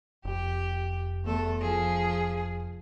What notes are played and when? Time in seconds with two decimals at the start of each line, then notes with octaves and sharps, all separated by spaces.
0.25 F1 G4
1.25 E2 A3 A4
1.62 F3 G#4